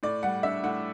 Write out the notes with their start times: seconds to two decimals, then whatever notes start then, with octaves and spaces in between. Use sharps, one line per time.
0.03 A2 D5
0.23 G3 F#5
0.43 D4 E5
0.63 A2 F#5